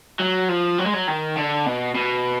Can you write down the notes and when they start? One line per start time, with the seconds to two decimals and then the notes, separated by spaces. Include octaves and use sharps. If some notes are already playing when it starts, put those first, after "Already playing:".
0.19 F#3
0.49 F3
0.78 F#3
0.86 G#3
0.93 F#3
1.08 D#3
1.37 D3
1.67 B2
1.95 B2